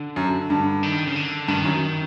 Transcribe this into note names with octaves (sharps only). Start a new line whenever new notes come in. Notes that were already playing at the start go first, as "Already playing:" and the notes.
Already playing: D3
F#2
G2
D#3
C#3
D3
G2 D#3
F#2